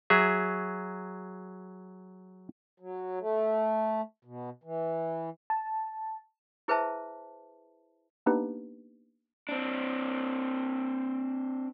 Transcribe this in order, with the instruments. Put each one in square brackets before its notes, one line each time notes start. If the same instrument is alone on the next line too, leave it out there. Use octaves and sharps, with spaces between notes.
[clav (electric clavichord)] F#3 G#4 E5
[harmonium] F#3
A3
B2
E3
[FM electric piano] A5
[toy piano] E4 G#4 B4 C5 E5 A5
[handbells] A#3 B3 D4 D#4 G4 B4
[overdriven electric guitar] C4 D4